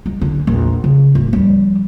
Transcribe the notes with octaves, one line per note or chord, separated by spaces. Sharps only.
G#3
D3
A#1 E2
C#3
D1
F3 G3